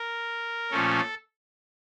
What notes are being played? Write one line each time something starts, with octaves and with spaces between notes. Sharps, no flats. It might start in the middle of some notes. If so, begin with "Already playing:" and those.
Already playing: A#4
A#2 F3 A3 C#4 A4